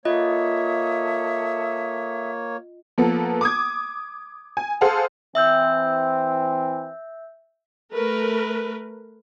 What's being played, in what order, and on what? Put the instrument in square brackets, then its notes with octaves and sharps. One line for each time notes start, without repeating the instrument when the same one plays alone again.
[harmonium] A#3 C#5 [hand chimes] F4 D#5 [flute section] A4 E5 D#6
[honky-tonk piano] F3 A#3 B3 A4
D6 D#6 G#6
G#5
G#4 A4 C5 F5 F#5 A5
[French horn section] E3 C4 [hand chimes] E5 E6 G6
[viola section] A3 A#4 B4